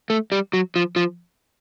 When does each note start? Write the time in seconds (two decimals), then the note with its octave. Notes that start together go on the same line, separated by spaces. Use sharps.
0.10 A3
0.32 G3
0.53 F#3
0.76 F3
0.96 F3